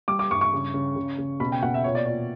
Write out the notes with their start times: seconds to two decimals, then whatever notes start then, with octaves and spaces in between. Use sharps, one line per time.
0.08 G3 D6
0.19 D6
0.30 G2 C#6
0.41 C#6
0.53 C#3
0.74 C#3
0.96 C#3
1.18 C#3
1.40 B2 B5
1.52 G5
1.63 B2 F#5
1.74 E5
1.84 A#2 C#5
1.95 D5
2.06 A#2 D5